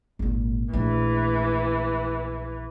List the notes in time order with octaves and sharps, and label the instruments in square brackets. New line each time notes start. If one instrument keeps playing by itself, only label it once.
[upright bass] G#1 A#2
[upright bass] A#1 A3 [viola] E3